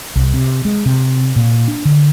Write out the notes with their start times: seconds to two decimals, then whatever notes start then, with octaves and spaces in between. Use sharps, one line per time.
0.16 C2
0.34 C3
0.65 G#3
0.86 C3
1.36 A#2
1.68 D4
1.85 D3